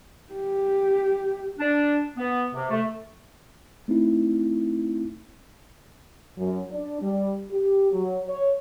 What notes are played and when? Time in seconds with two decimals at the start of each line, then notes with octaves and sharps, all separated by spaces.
0.34 G4
1.59 D4
2.17 B3
2.54 C3
2.70 A3
3.88 A3 C4 D#4 E4
6.38 F#2
6.71 D4
7.02 G3
7.52 G4
7.92 F#3
8.28 C#5